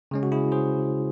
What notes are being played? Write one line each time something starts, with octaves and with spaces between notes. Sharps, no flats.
C#3 G#3 C#4
F#4
E4 G#4
G#4 C5